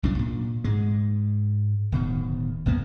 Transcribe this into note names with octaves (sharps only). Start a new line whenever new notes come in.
C2 F#2 A#2 D4
A#2
G#2 G#3
D1 B2 D#3
F1 E2 A#3 B3